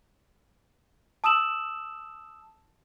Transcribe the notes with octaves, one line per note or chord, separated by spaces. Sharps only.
A5 D#6 E6 E7 F#7